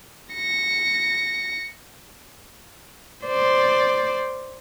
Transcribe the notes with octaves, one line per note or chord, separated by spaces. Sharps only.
A#6 C#7
C5 D5